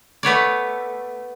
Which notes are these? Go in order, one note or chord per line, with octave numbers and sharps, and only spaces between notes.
A3 B3 C#5 D5